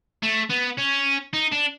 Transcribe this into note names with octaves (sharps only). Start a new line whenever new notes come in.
A3
B3
C#4
D#4
D4